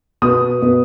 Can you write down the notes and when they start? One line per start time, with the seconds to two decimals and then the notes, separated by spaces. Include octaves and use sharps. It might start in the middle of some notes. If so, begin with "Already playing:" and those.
0.22 B2 B3 D#6
0.62 B2 B3